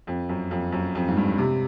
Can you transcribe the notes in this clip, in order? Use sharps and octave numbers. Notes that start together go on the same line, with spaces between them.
F2
F#2
F2
F#2
F2
G#2
G2
C3